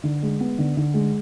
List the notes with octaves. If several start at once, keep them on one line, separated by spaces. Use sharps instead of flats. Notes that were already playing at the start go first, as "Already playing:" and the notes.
D3
G#3
B3
D3
D3
G#3